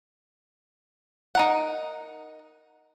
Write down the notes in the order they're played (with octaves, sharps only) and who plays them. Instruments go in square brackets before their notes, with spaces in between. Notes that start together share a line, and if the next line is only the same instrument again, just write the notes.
[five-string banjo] D#4 A#4 F#5